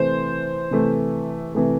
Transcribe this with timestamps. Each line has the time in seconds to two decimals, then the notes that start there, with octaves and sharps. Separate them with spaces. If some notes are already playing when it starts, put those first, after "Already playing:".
Already playing: C3 E3 A3 C5
0.71 C3 E3 A3
1.54 C3 E3 A3